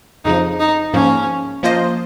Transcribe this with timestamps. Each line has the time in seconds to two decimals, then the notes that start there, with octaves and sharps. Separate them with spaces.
0.25 F2 C#3 F3 D#4
0.60 D#4
0.93 G#2 F3 A#3 C#4
1.63 F3 A#3 F4 C5 D#5